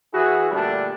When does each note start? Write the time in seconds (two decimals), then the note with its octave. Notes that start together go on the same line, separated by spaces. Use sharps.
0.13 E3 E4 F#4 G#4
0.52 A#2 D3 G3 A3 D4